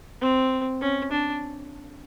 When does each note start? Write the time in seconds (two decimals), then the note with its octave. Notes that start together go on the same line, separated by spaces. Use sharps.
0.21 C4
0.81 C#4
1.11 D4